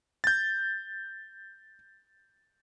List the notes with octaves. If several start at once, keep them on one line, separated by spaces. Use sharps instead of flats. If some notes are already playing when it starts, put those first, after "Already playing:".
G6 A6